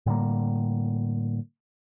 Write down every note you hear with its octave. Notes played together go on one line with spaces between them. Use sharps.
A2 D3 G3 A#3